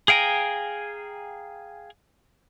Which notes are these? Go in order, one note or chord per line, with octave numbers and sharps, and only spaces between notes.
G#4 F5 G5 G#5 A#5